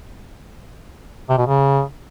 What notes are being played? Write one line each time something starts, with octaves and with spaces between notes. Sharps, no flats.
C3
B2
C#3